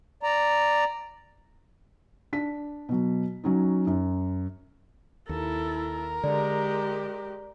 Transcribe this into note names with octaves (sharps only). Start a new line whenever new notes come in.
D5 A#5
D4 B6
B2 F#3
F#3 C#4 D#4
F#2
D#2 E4 A4 A#4
D3 G#3 G4 D5